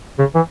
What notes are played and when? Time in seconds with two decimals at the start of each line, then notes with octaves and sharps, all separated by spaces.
0.19 C#3
0.35 E3